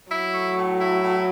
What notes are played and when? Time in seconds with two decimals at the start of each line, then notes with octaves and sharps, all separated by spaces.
0.11 F#3 E4
0.35 A3
0.56 A2
0.79 E4
1.02 A2